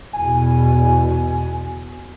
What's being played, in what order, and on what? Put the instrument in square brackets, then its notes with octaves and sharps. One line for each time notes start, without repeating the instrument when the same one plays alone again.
[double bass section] E2 B2 [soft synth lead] G#5